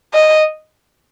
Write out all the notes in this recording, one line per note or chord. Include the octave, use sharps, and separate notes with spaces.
D#5